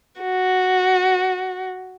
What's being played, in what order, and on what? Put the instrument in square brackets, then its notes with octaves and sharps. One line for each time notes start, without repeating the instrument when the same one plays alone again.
[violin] F#4